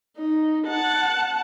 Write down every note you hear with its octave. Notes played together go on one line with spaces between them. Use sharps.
D#4
F#5 A5